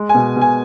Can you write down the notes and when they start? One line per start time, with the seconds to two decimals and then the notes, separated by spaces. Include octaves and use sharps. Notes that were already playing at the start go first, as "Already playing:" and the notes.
Already playing: G#3
0.09 G#5
0.14 B2
0.36 B2
0.41 G#5